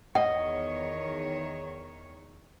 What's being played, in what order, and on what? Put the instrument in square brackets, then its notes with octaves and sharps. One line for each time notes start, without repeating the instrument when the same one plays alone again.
[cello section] E2 D#3 C#5 [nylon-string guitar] D#5 [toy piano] F#5